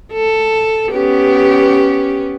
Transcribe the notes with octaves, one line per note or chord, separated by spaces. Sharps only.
A4
B3 C#4 G4